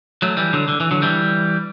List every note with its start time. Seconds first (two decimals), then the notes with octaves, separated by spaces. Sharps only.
0.22 F#3 A3
0.37 E3 G3
0.53 D3 F#3
0.68 D3
0.80 E3
0.91 D3 F#3
1.02 E3 G3